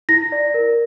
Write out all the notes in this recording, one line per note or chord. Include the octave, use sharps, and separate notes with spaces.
E4 A#6
D5
A#4